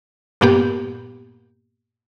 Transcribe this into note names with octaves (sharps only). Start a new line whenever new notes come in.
G2 A#2 A#3 B3 G4